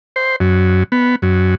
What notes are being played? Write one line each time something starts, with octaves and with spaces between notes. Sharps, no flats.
C5
F#2
B3
F#2